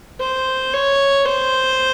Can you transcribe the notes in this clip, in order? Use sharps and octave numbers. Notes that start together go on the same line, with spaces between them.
C5
C#5
C5